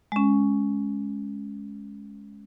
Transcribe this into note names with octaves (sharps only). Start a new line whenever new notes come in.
G#3 C#4